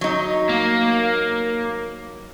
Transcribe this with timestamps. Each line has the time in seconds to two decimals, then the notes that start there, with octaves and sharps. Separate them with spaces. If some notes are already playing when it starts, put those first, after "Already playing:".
0.01 F#3 D#4
0.49 A#3